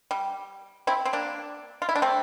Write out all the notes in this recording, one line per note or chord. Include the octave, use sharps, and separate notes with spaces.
G3
C4 E4
C4
A#3 D4
F4
E4
D4
A3 C4